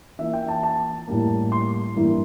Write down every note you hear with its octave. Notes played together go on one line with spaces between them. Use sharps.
E3 A#3 F4 E5
G5
A5
A5
A2 G3 A#3
C6
G2 E3 A#3 E4